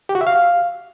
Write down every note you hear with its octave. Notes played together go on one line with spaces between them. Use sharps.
G4
F#4
E5
F5